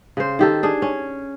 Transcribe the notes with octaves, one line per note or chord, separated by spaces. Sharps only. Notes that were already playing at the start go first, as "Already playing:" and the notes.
C#3 C5
D#3 G4 A4
D4 G#4
C#4